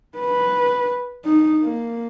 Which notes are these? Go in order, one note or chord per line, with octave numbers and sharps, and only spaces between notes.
B4
D#4
A#3